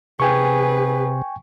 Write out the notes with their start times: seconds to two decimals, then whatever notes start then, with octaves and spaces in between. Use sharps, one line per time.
0.20 C3 G#4 B4 G5 G#5 C#6